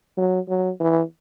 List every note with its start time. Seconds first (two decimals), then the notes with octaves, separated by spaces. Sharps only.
0.18 F#3
0.49 F#3
0.80 E3